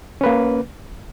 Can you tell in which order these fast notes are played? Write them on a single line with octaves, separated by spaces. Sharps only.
C#4 B4 A#3